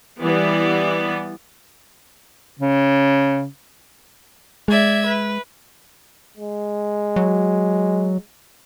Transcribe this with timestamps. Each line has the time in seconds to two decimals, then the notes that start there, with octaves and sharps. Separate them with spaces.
0.21 E3 G3 B3 D5
2.59 C#3
4.68 G#3 D5 E5 G#6
5.07 B4
6.37 G#3
7.16 F#3